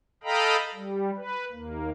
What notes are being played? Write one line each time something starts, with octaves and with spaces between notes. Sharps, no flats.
A4 D#5 F5 G5 A#5 B5
G3
B4
D#2 A#3